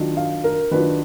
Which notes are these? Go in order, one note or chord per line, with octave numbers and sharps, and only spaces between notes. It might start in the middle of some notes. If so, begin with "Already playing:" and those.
Already playing: D#3 F#3 D4 F4
F5
A#4
D#3 F#3 D4 F4 B4